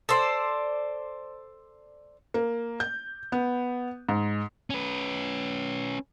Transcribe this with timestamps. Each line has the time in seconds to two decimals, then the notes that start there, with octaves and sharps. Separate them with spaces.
0.09 A4 C5 D5
2.34 A#3
2.80 G6
3.32 B3
4.09 G#2
4.70 C#4 B4